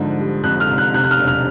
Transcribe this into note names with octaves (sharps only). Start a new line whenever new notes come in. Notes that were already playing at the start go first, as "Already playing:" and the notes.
Already playing: G#2 D3 F3
G3
F2 F#6
F6
F1
F#6
C3 F#6
F#6
F6
E1
F6